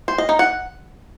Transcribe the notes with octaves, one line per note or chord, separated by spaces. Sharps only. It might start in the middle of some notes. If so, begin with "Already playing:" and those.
C5
D#5
D#4
F#5